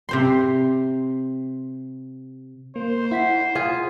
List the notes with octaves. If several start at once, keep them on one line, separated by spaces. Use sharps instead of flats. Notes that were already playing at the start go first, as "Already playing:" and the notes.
C3 C5 C6
A#3 C5
E4 F#5 B6 C7
F4 G#4